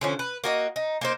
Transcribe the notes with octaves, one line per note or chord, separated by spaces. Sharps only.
D3 F3 C#4
B4
A#3 F#4 D#5
D#4
A#3 D#4 C5